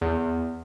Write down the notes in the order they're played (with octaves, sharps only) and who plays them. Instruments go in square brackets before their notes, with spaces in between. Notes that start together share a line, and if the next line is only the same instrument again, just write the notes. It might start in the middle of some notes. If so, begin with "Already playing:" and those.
[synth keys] E2